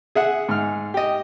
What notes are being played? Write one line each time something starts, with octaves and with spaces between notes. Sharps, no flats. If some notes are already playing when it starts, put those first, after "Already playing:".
G#4 E5 F#5
G#2 F6
G4 D#5